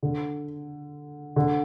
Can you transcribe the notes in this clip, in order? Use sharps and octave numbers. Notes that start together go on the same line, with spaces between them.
D3
D3